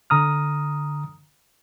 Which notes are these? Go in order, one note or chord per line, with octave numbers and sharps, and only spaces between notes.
D3 A#5 D#6 F6